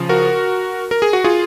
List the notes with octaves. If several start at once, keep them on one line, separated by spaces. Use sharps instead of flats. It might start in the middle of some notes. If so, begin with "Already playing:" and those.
Already playing: C#3 F3
F#4 A#4
A#4
G#4
F#4
F4 G#4